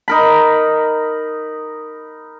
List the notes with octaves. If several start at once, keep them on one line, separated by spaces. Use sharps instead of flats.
D#4 A#4 B5